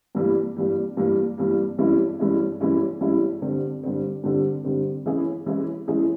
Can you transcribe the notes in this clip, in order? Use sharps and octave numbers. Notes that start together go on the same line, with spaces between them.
G2 E3 G3 A#3
G2 E3 G3 A#3
G2 E3 G3 A#3
G2 E3 G3 A#3
G2 E3 G#3 C#4 E4
G2 E3 G#3 C#4 E4
G2 E3 G#3 C#4 E4
G2 E3 G#3 C#4 E4
G2 D3 G3 C4
G2 D3 G3 C4
G2 D3 G3 C4
G2 D3 G3 C4
E3 G#3 C#4 E4 G#4
E3 G#3 C#4 E4 G#4
E3 G#3 C#4 E4 G#4